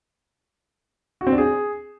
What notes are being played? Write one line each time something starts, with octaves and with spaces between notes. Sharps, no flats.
F#4
C4
D4
G#4